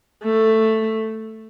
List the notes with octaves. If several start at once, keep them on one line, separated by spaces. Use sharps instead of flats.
A3